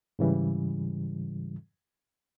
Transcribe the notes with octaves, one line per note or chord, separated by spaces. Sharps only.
G#2 C#3 E3 G3